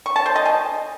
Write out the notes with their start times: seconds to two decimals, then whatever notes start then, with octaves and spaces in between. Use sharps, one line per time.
0.06 C#6
0.16 A5
0.26 C5
0.36 D#5
0.45 G#5